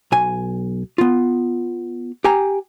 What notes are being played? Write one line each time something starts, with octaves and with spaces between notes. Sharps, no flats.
B1 G#5
B3 F4
G4 G5 G#5 A#5